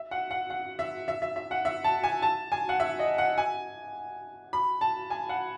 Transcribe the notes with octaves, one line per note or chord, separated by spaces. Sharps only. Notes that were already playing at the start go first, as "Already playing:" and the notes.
Already playing: E5
F#5
F#5
F#5
E5
E5
E5
E5
F#5
E5
A5
G#5
A5
G#5
F#5
E5
D#5
F#5
G#5
B5
A5
G#5
F#5